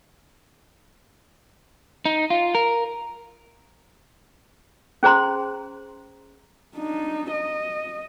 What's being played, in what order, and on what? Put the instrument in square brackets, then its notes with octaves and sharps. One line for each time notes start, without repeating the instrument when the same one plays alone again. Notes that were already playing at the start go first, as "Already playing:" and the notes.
[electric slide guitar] D#4
F4
A#4
[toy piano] C#4 G#4 C5 A#5 C6
[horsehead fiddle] D4 D#4
D#5